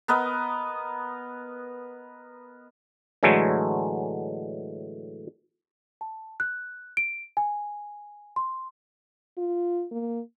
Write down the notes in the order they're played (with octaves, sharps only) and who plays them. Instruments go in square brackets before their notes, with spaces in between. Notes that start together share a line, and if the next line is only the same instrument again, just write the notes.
[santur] B3 A#4 B4 D#5
[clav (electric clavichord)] A2 D3 E3 F#3 G#3 A3
[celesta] A5
F#6
D7
G#5
C6
[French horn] F4
A#3